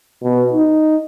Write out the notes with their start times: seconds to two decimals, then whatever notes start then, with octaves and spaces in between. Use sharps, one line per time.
0.23 B2
0.53 D#4